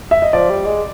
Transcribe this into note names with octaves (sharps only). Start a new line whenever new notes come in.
E5
D#5
F3 D5
G3
G#3